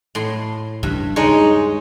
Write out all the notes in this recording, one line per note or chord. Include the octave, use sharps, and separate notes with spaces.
A2 C6
G2 C#3
D#2 G#3 D#4 C#5